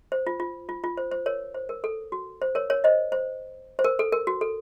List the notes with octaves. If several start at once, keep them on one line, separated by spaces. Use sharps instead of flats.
C5
F4
F4
F4
F4
C5
C5
A#4 C#5
C5
A#4
A4
F#4
C5
A#4 C#5
A#4 C#5
C5 D#5
C5
C5
A#4
A4
A#4
F#4
A4